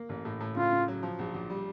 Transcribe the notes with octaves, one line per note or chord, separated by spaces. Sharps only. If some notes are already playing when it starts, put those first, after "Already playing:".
Already playing: A#3
A1
A2
A2
C#3 F4
C#3
F#3
F3
A#1
A#1
G3